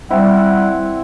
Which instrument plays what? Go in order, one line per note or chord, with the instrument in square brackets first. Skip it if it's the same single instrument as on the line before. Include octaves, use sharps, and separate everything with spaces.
[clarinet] G3 [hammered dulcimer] C4 E4 [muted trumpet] F#5